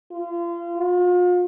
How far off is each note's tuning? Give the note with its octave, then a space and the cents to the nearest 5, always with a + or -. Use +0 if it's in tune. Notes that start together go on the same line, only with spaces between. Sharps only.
F4 -30
F4 +40